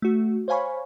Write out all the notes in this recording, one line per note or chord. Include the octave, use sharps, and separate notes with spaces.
A3 F#4
C5 C#5 F5 G#5 B5 C#6